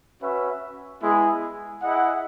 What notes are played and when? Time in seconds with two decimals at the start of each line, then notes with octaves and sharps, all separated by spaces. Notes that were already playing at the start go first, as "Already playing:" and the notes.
0.22 C#4 F#4 B4 E5
1.02 G#3 B3 E4 G#4
1.82 E4 G#4 D#5 F#5